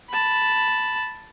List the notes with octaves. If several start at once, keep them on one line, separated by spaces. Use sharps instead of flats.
A5 B5